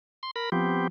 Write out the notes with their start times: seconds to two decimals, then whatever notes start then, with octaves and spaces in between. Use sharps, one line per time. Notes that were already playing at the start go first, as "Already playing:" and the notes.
0.23 C6
0.36 A#4 B5
0.52 F3 B3 C4 G4